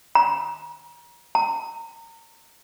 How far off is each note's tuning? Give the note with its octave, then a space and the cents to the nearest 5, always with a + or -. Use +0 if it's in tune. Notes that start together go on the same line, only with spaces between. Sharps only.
A#5 +30
A#5 -25